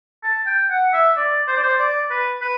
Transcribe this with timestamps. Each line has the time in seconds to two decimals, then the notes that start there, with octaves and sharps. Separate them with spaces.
0.23 A5
0.47 G5
0.70 F#5
0.94 E5
1.17 D5
1.48 C5
1.56 D5
1.63 C5
1.79 D5
2.10 B4
2.41 B4